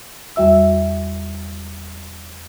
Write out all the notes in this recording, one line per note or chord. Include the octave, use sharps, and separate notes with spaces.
E2 G3 F#4 E5 E6